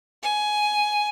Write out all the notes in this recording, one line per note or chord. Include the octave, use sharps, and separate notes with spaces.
G#5